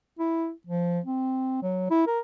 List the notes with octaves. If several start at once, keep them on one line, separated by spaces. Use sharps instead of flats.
E4
F3
C4
F#3
E4
A#4